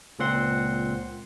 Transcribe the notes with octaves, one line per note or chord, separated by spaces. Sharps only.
C#2 A#2 C4 F#5 C6